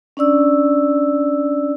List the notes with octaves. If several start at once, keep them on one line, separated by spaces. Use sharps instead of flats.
C#4 D4 D5 E6